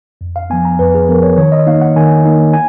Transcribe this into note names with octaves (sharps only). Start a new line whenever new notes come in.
F2
F5
F3 B3 G#5
A#5
F2 B4
G#4
F3 B3 A#4
C#5
D#3 C#5
D#5
A#3 D#4 F5
F#5
D#3 G#5
A#3 D#4
G#5